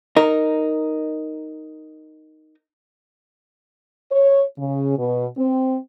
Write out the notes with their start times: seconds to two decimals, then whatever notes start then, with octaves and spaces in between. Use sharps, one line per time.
0.16 D#4 A#4
4.11 C#5
4.57 C#3
4.97 B2
5.36 C4